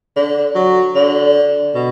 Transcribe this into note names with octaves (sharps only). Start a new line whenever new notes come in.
D3
F#3
D3
B2